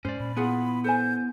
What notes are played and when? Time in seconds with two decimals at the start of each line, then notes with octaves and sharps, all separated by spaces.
0.05 G#2 G#3 C#4 C5 D5
0.20 A#2 B5
0.37 B3 E4 F4 G#4 F#5
0.84 A4 C5 G#5 G6